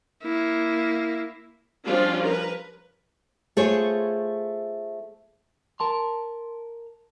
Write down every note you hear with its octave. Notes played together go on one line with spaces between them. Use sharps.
A#3 E4
F3 G3 C#4 D4 F4
A#4 B4
A3 F4 G#4 C5 C#5
A#4 A5 C6